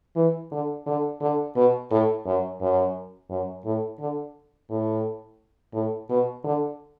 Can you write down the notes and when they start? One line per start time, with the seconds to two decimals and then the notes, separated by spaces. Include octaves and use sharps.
0.15 E3
0.51 D3
0.86 D3
1.21 D3
1.56 B2
1.91 A2
2.25 F#2
2.61 F#2
3.30 F#2
3.65 A2
4.00 D3
4.70 A2
5.74 A2
6.09 B2
6.44 D3